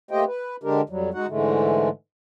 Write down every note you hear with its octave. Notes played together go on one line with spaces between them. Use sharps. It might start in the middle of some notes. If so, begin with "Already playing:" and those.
A3 A#3 G4 C5 D#5 G5
B4
D3 G#3 D4 G4 A#4
F2 F#3 G3
G#3 D#4 F#4 F#5
G#2 D3 E3 G#3 A3